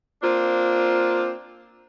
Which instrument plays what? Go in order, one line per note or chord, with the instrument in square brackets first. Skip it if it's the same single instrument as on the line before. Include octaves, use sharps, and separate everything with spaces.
[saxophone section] A#3 C4 D4 F4